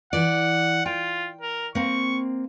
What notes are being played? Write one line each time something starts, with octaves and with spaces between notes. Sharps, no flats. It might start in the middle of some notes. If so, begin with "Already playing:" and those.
E3 D5 F#5
F4 G5
A#4
A#3 C4 C#6